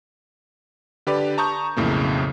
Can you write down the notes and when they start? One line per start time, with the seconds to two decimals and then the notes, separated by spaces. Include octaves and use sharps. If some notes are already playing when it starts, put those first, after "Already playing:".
1.07 D3 G4 B4 D5
1.38 A5 A#5 C#6 D#6 G6
1.77 B1 F2 A2 C#3 A#3